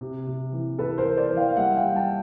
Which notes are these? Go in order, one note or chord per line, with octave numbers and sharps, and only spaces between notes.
C3
C3
E3
E3 A4 B4
A#4 C5
E3
C5 D5
E3
F5 G5
F5
G3 E5 F#5
F5 G5
G3
G5 A5